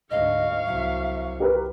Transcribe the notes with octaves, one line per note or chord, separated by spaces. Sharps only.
D2 G#2 D#5 F5 C#6
C2 F#3 E5
G4 A#4 B4